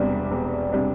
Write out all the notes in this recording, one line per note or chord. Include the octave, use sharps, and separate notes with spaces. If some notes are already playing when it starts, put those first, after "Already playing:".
Already playing: E1 E2 C3 G3 D4
E1
C3 G3 D4